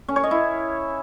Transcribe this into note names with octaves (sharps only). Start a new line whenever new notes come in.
C#4
C#5
D#5
E4